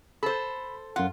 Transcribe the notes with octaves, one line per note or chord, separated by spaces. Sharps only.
A4 C5 B5
F#2 F4 F#5